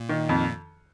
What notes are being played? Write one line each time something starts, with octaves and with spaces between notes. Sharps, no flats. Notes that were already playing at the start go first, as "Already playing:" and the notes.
Already playing: A#2
D#3
F2